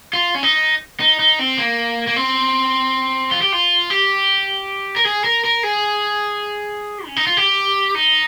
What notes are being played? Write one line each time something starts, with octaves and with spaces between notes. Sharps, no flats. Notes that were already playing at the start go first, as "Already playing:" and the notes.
F4
C#4
D#4
D#4
D#4
C4
A#3
A#3
C4
F4
G4
F4
G4
A#4
G#4
A#4
A#4
G#4
C#4
D#4
F4
G4
D#4